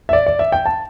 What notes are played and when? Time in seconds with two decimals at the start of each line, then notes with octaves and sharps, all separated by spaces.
0.09 E5
0.13 D5
0.27 D5
0.39 E5
0.52 G5
0.66 A5